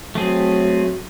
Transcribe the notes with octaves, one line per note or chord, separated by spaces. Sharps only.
F#3 A3 C4 G#4